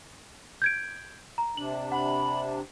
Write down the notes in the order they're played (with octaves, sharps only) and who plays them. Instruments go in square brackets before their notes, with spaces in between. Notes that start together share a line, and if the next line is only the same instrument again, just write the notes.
[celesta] G6 G#6 D7
A#5
[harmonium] C3 D4 [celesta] F#7
[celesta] F#5 [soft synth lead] B5